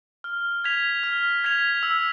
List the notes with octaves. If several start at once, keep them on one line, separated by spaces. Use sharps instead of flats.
F6
G#6 B6 F7
F6
G#6 B6 F7
E6